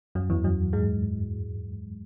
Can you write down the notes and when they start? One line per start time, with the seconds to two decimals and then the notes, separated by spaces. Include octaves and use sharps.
0.15 F#2 F#3
0.30 E2 E3
0.44 F#2 F#3
0.73 G#2 G#3